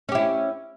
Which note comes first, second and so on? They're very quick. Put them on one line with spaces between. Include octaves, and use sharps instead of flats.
C#4 G4 E4